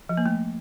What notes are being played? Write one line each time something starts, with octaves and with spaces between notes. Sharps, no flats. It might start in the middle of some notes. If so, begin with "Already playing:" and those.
F3
A#3
A3